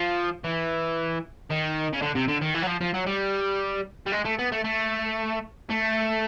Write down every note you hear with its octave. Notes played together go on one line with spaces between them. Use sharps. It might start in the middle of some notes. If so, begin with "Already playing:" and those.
Already playing: F3
E3
D#3
C#3
D3
C3
D3
D#3
E3
F#3
F3
F3
F#3
G3
G3
G#3
A3
B3
A3
A3
A3